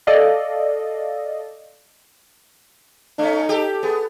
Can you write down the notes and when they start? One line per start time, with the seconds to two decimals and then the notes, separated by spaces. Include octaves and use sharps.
0.07 A4 D5 D#5 F5
3.19 A3 C#4 D#4
3.49 G4 A4
3.83 B3 G#4